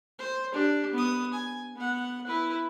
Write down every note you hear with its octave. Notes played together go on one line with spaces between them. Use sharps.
C5
D4 G4
B3 D#6
G#5
B3 F#5
E4 B4